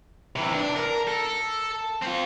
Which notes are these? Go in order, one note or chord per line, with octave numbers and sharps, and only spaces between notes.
C3 E3
D4
A#4
A4
C4 F4